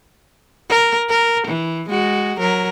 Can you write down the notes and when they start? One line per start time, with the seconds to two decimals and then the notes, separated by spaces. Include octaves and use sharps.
0.69 A#4
1.09 A#4
1.47 E3
1.89 G#3 F#4
2.39 F#3 A#4